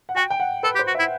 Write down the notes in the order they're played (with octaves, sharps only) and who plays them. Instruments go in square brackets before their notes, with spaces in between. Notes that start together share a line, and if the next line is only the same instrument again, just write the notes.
[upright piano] F#5
[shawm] F#4 [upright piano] G5
[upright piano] G5
F#5
[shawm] A4 [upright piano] B4
[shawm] G4
[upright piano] C5
[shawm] F#4
[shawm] E4 [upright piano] E5